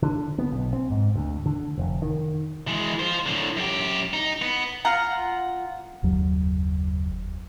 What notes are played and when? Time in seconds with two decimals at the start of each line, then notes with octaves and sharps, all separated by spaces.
0.03 D3
0.38 B3
0.52 B1
0.73 C4
0.91 G#2
1.16 D2
1.46 D3
1.78 F1
2.02 D#3
2.68 E3 G#3
2.99 F4 C5
3.26 A2 D3
3.57 F#2 G4
4.13 D#4
4.42 B3
4.85 F4 F#5 A#5
6.03 F#1 D#2 F#3